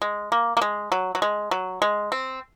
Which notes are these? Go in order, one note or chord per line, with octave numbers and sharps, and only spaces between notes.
G#3
A#3
A#3
G#3
F#3
F#3
G#3
F#3
G#3
C4